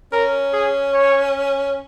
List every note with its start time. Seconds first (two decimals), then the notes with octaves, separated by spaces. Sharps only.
0.12 C#4 A#4
0.53 G#4
0.94 C#5